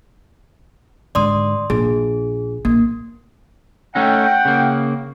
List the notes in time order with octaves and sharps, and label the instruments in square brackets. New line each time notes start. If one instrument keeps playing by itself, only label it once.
[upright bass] G#2 D3 [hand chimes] D5 C6 D#6
[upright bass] A#1 [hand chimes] G#4
[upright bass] A#1 [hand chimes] A#3
[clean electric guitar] A3 C#4 D#4 [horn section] F#5 G5
[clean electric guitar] C#3 A#3